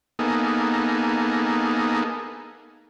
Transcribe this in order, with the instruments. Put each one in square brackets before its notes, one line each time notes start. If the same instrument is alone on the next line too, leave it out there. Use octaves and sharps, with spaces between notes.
[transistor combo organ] A#3 B3 D#4 G#4 A4